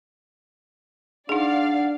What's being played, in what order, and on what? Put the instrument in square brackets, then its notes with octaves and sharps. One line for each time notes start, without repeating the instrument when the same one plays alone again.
[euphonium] D4 [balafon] D#4 G#4 [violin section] D5 F5 [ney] F#5